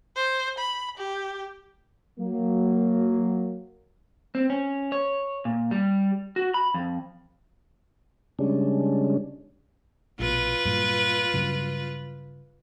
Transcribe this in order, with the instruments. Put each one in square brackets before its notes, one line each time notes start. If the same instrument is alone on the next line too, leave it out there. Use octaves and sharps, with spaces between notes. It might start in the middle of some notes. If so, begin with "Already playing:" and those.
[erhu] C5
B5
G4
[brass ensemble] F#3 A#3
[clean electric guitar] C4
C#4
C#5
A#2
G3
F#4
B5
F2
[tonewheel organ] C#3 G3 G#3 C#4 D4
[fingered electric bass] A#1 B2 [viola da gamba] F4 B4
[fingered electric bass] G2 A#2 F#3
G2 C#3 F#3